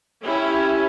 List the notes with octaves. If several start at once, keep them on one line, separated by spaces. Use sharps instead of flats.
C#4 E4 G4